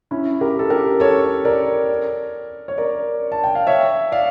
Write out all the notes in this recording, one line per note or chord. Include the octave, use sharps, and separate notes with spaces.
C#4 E4
G4 A#4
A4
G4 A#4
A4 C#5
A#4 D5
C#5
A#4 D5
A5
G5
F5
C#5 E5
D5 F5